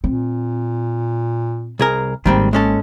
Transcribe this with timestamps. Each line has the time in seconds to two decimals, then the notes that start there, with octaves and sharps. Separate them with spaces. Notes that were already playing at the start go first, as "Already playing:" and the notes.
0.04 A#2 C4
1.79 C2 G#4 A#4
2.26 G#1 D#3 G3 A#3 C4
2.53 G#3 C#4 A4